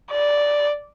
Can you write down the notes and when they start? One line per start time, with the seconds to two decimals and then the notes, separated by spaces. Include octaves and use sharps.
0.11 D5